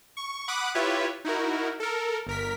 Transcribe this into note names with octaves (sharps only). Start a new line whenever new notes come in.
C#6
F#5 B5 D6 D#6 F#6
E4 F4 G4 B4 C#5 E5
D#4 E4 F#4 A#4
A4 A#4
G1 A#4 B6